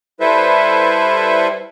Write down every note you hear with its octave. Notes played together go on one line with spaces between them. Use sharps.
G3 E4 A4 B4 C5 E5